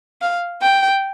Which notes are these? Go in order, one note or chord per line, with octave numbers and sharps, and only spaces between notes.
F5
G5